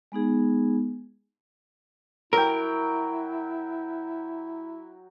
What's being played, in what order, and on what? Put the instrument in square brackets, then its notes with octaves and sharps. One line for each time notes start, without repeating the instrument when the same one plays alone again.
[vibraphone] G#3 B3 D#4 G#4
[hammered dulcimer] F#3 G5 [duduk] E4 [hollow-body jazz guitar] A#4